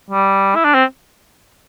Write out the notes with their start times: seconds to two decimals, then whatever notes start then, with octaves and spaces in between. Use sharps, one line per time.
0.10 G3
0.56 E4
0.64 D4
0.75 C4